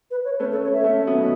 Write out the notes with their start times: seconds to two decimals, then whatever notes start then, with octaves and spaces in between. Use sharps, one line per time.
0.11 B4
0.25 C#5
0.40 A3 C#4 B4
0.51 A4
0.63 C#5
0.73 E5
0.84 A3 C#4
1.07 F#3 B3
1.18 B2